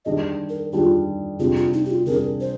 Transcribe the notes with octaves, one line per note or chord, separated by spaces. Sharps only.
D#3 G3 D4 G#4 D#5
A#4
D#3 G3 D4 F4 G#4
C3 G3 D4 F4 G#4
F4
D#4
G4
F4
C3 G3 D4 G#4 A#4
C5